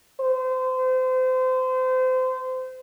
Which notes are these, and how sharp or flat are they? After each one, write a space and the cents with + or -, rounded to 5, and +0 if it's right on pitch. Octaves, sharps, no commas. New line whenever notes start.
C5 -30